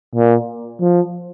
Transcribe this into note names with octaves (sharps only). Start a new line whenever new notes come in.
A#2
F3